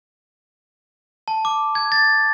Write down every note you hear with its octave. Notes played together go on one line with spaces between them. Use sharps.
A5
D6
G#6
A6